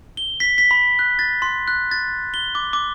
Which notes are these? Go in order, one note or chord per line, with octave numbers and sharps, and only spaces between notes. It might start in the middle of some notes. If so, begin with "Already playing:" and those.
G7
B6
B6
B5
F#6
A6
C6
F#6
A6
G7
D6
D6